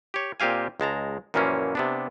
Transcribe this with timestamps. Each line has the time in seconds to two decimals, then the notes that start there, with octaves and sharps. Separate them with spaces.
0.14 G4 C#5
0.40 A#2 C4 G4 F5 G#5
0.80 C#2 G#3 A5 A#5
1.34 F#2 A#2 E3 F3 A#3 C#4
1.75 C3 B3 D4